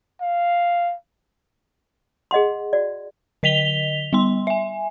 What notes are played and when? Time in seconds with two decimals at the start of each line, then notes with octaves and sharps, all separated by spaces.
0.21 F5
2.31 G#4 D#5 F#5 C6
2.73 F#4 D5
3.43 D3 D#5 B6 F7 G7
4.13 G3 B3 C6
4.47 E5 G#5